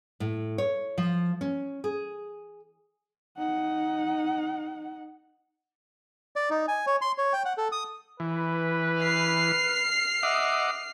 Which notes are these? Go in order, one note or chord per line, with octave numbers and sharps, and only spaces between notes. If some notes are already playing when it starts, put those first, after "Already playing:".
A2
C#5
F3
C#4
G#4
D#4 F#5
D5
D#4
G#5
C#5
C6
C#5
G5
F#5
A4
D#6
E3 B4
F6 C7
D#5 E5 F#5 D6